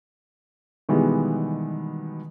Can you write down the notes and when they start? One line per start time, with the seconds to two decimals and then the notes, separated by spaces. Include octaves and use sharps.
0.89 B2 D#3 E3 G3 G#3 B3